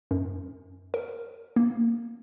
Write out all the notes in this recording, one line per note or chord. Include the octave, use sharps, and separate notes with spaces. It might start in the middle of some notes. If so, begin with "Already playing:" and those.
F#2
A#4
A#3